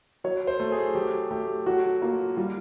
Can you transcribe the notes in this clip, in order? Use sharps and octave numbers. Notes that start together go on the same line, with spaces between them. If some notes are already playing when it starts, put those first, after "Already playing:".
F#3 C#5
C5
A3
G#4
F#3 G4
A3 G4
F#3 F#4
A#3 F4
G3 F4